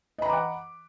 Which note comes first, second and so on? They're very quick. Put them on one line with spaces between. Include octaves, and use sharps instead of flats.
D#5 B5 A#5 D6 F#5